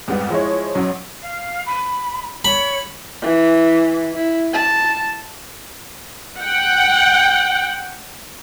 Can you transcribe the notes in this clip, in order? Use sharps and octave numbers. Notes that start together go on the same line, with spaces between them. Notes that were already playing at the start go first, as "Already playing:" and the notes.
F2 G#2 G3 B3
F3 G#3 E4 C#5
B1 F#2 F#3
F5
B5
C#5 B5
E3
E4
A5
F#5 G5